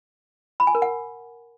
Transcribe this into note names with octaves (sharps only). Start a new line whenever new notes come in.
B5
G#5
A#4
F#5